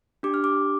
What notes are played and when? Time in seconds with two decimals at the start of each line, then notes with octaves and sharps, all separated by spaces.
0.23 D4 G4 D6
0.34 F6
0.44 D6